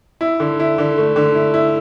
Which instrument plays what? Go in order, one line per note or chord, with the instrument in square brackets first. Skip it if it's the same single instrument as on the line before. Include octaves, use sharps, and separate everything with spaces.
[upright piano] E4
D3
E4
D3
A3
D3
E4
E4